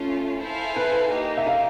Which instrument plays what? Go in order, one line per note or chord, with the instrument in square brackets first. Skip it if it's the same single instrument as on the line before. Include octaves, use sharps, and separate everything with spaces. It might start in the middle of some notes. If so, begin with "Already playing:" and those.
Already playing: [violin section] A3 C#4 F4
E4 A4 C5 F5 G#5
[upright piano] B4
[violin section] A#3 D#4 G4
[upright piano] E5
F5